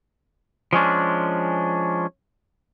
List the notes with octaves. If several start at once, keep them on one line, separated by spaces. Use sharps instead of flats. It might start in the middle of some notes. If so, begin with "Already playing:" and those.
F3 G#3 C#4 D4